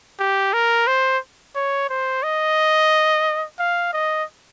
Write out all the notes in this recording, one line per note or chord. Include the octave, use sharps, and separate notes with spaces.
G4
A#4
C5
C#5
C5
D#5
F5
D#5